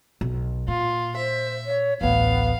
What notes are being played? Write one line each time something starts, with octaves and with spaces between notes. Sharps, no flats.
B1
A#2 F4
C5 E5
C#5
A1 D2 B3 F5